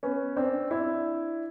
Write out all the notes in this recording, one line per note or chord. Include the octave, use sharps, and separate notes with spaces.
B3 C#4
C4 D4
D4 E4